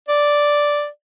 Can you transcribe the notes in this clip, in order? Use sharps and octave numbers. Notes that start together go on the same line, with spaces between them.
D5